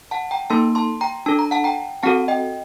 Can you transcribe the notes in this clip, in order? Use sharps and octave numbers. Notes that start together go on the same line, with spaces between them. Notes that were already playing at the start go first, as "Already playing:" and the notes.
F#5 A5
G5 A#5
A#3 D#4 A4 A5 C6
A5 C6
G5 A#5
D4 A4 A5
A#5
F#5 A5
G5 A#5
C4 F#4 A4 F#5 A5
D#5 G5